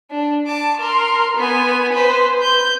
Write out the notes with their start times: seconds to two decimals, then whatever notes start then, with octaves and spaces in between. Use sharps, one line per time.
0.10 D4
0.46 A5 D6
0.80 A#4 C6
1.36 B3 G#5
1.93 B4 C5
2.42 G6